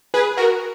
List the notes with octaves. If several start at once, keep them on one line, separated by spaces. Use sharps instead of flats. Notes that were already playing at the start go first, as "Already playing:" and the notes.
G#4 B4
F#4 A#4